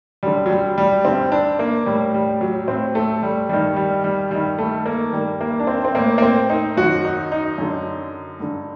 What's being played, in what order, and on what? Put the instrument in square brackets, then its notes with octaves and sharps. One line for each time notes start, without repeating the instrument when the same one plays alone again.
[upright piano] F#2 D3 G3
F#3
G3
G3
G2 D3 C4
D4
A#3
A2 G3
G3
F#3
A2 C4
A3
G3
G2 D#3 G3
G3
G3
G2 D#3 G3
A3
A#3
G2 D#3 G3
A#3
D4
C4
C4
A2 A#3
A#3
C4
D#4
F#2 D#3 F#4
D#4
D#4
F#2 D3
G2 D3